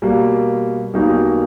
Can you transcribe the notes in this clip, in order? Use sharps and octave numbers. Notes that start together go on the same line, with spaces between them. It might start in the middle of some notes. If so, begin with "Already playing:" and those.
B2 G3 A#3
B1 B2 G3 A#3 D#4